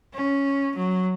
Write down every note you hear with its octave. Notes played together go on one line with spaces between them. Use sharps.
C#4
F#3